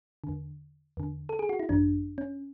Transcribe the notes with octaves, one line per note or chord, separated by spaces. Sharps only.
D3
E2
E2 D3
A4
G#4
F#4
E4
G#1 F#2 E3 D4
C#4